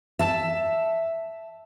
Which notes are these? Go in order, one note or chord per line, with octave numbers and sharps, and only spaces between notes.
E5 A5